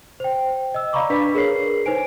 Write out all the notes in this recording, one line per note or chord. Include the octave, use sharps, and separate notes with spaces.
C5 G5
D#5 E6
D5 F5 A#5 B5 C#6 D6
D4 B4 B6
G#4 A#4 C#5 C7
D#4 B4 C5 G#5 D7